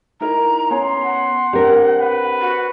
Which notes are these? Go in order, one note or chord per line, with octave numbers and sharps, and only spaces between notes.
D#4 E4 A#4 A#5
B3 C#4 G#5 C6
F#5
C4 D4 G4 A#4
B4
F#4